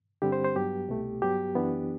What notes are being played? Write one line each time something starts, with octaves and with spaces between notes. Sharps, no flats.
G2 D3 G3 C4 G4
C5
C5
G2 F#3 B3 G4
C2 B2 A3
G2 F#3 B3 G4
F#2 E3 B3 D4